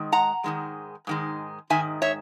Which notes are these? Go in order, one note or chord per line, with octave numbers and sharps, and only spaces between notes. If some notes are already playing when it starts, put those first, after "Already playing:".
Already playing: G#2 D#3 G#3
F#5 A#5
G#2 D#3 G#3
G#2 D#3 G#3
G#2 D#3 G#3 E5 G#5
C#5 E5